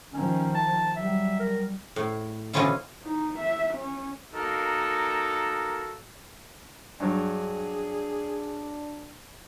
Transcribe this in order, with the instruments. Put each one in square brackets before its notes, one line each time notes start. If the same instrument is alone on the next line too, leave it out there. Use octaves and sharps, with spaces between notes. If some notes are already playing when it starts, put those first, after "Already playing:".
[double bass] D#3 F3 [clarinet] C#4
[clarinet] A5
[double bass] F#3 G3 [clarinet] E5
[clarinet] A#4
[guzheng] A2
B2 D3 E3 C#4 E4 F4
[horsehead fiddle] D#4
E5
C#4
[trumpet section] A#3 D#4 F#4 A4 A#4
[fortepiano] G2 F#3 [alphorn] D4 [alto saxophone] G#4